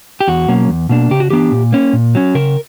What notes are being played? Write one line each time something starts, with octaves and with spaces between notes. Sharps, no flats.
G4
E2 F#4
B2 F#3 A#3 C#4
E2
B2 A#3 D4
C#3 G4
F#4
E3 B3 D4 G4
A#2
A#3 C#4
A#2
F#3 C#4
C#3 A#4